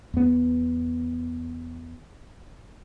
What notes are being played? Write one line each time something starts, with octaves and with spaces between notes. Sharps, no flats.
E2 B3